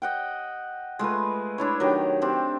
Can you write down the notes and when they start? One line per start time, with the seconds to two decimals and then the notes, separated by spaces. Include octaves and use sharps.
0.02 D#5 F#5 G5
0.99 G#3 A3 F4 B4
1.58 D4 E4 C#5
1.80 D#3 F#3 G4
2.22 C4 D4 G4